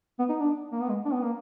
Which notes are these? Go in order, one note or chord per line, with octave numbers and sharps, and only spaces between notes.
B3
D#4
D4
A#3
B3
G#3
D4
B3
A#3